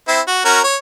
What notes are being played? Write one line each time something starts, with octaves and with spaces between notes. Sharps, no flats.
C4 E4
F#4
C#4 F#4 A#4
C#5